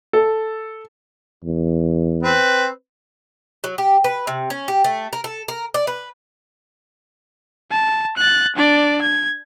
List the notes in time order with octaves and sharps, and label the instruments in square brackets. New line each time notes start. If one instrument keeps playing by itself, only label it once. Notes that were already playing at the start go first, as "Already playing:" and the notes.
[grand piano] A4
[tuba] E2
[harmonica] C4 B4
[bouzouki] F#3
G4
B4
C3
C#4
G4
A3
A#4
A4
A#4
D5
B4
[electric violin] A5
F#6 A6
D4 D5
G#6